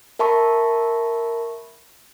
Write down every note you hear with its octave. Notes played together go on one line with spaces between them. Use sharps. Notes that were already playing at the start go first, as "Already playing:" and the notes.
A#4 E5 A5 B5 C#6